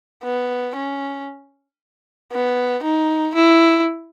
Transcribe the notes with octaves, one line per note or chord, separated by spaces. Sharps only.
B3
C#4
B3
D#4
E4